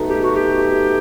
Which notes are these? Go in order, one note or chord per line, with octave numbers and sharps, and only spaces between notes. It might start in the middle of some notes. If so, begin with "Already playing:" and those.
Already playing: B2 A3 D#4
G4
F#4
G4